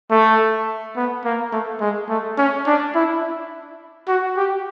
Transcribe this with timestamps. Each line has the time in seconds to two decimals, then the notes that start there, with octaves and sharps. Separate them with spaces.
0.11 A3
0.96 B3
1.25 A#3
1.52 A3
1.81 G#3
2.09 A3
2.38 C#4
2.67 D4
2.95 E4
4.08 F#4
4.37 G4